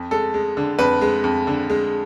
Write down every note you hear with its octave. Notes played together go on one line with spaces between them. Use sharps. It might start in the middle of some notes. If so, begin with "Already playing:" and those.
Already playing: F2
G#3 A4
G#3
D3
F2 B4
G#3
F2
D3
G#3